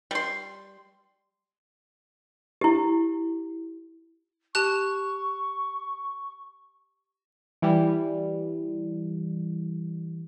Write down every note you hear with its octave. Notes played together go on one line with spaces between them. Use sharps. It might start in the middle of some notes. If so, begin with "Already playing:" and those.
G3 C6
E4 G4
G4 A5 C#6 F#6
E3 G3